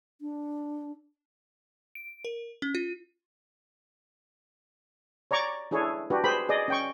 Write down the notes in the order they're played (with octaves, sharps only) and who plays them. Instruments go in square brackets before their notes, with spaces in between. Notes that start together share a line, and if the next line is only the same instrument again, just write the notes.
[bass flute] D4
[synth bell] D7
A#4
C#4
F4
[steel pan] C#5 D5 A#5 C#6 D6
D4 E4 G#4 A4 C#5
D4 F#4 G4 B4
G#4 B4 C5 B5
G#4 D5 D#5
C#4 G5 C#6